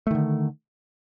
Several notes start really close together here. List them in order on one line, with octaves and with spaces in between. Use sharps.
A3 D#3 D3